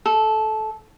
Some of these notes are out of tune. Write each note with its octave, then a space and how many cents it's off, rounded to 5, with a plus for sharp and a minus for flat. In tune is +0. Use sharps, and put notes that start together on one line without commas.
A4 -15